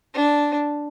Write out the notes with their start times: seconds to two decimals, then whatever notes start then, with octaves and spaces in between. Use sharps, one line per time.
0.14 D4